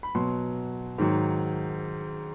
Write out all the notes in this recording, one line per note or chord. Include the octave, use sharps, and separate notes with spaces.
B5
B2 F#3 C6
G#2 D#3 F#3